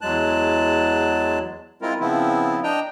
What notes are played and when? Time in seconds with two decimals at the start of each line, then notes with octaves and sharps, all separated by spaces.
0.01 E2 F#3 G#3 A5 F#6
1.82 G#3 C4 E4 F4 A#4
2.00 C#3 F3 B3 C4 E4
2.64 D4 D#5 G5 A#5